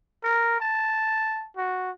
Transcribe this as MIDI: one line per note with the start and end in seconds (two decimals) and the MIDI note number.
0.24 0.59 70
0.60 1.45 81
1.57 1.91 66